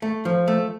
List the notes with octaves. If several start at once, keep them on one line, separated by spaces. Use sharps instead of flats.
A3
F3
A3